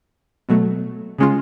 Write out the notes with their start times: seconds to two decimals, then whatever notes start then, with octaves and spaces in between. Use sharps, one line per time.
0.49 B2 F#3 A3
1.18 C#3 G#3 C#4 F4